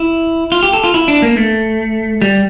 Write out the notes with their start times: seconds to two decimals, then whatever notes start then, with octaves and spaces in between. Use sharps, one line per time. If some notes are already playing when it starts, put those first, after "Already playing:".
Already playing: E4
0.52 F4
0.63 G4
0.73 A4
0.84 F4
0.94 E4
1.08 D4
1.22 A#3
1.37 A3
2.22 G3